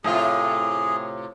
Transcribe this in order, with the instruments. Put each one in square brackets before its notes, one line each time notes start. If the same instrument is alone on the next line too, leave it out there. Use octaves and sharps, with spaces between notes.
[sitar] A2 C3 F4 [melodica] G#4